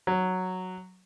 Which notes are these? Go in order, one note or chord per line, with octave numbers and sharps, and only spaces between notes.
F#3